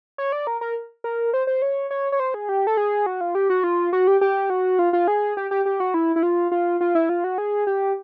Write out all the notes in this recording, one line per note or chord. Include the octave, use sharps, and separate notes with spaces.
C#5
D5
A#4
A#4
A#4
C5
C5
C#5
C#5
C#5
C5
G#4
G4
A4
G#4
F#4
F4
G4
F#4
F4
F#4
G4
G4
F#4
F4
F4
G#4
G4
G4
G4
F#4
E4
E4
F4
F4
F4
E4
F4
F#4
G#4
G4